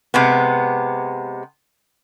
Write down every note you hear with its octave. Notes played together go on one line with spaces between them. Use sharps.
C3 G#3 B3